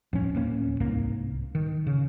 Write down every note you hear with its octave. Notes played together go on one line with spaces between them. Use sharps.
D1 F3 C#4
D1 A#3 B3 C#4
C2 G#2 A#3
D#3
C#3